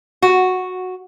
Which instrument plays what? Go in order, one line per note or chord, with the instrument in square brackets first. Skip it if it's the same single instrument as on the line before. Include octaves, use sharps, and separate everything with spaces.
[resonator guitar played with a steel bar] F#4